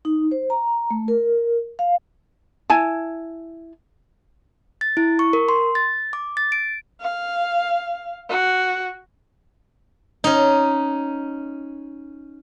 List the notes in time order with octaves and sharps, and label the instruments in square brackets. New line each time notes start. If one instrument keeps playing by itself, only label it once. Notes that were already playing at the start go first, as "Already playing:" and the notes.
[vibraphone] D#4
C5
A#5
A3
A#4
F5
[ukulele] E4 G#5 A5
[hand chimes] A6
E4
C#6
A#4
C6
A6
D6
A6
D7
[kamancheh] F5
F#4
[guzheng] C#4 D#4